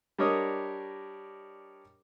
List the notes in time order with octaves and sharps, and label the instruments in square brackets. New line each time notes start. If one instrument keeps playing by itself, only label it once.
[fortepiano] G3 D4 A#4 C#5 D#5 D#6